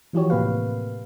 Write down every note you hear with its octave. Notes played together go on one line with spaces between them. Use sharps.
E3 F3 E4 F#4 G4 C#5
A2 C3 A#3 B4 F5